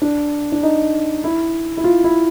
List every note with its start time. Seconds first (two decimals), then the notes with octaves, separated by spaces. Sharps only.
0.02 D4
0.52 D4
0.63 D#4
1.24 E4
1.77 E4
1.84 F4
2.04 E4